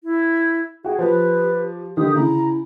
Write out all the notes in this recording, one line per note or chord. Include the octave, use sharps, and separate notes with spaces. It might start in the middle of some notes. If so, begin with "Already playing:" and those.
E4
F#4 G#4 G5
F3 G4 B4
D3 D#3 G4 D#6
C#3 E4 A#5